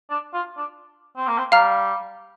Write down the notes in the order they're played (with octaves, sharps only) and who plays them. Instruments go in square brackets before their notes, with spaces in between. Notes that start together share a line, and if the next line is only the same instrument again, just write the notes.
[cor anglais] D4
F4
D4
C4
A#3
C4
[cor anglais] G3 [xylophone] F5 A#5 F6